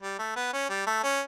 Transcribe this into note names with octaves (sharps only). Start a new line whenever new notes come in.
G3
A3
B3
C#4
G3
A3
C#4